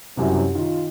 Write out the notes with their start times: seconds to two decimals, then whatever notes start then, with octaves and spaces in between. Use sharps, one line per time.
0.17 F#2 C3 F#3 G3 E4
0.55 D#3 F4